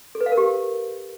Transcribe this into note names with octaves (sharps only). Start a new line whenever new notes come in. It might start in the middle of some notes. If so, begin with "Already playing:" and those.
A4
B4
F5
A#4
G4